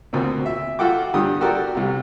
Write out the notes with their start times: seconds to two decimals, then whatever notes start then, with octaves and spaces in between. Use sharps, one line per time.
0.13 D2 B2 A#3 C4
0.46 E5
0.79 F4 F#4 A4 F#5 G5 D6
1.14 G2 D3 G4 D#6
1.41 F#4 G4 A4 A#4 D5
1.75 C2 C3